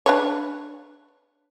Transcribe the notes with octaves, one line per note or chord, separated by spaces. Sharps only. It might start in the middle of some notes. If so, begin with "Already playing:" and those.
D4 B4 C#5